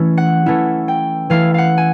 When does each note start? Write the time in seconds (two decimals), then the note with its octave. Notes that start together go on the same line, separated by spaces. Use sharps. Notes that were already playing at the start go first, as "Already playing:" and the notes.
Already playing: E3 A3 C#4 E4
0.17 F#5
0.46 E3 A3 C#4 E4
0.88 G5
1.30 E3 A3 C#4 E4 F5
1.54 F5 F#5
1.78 G#5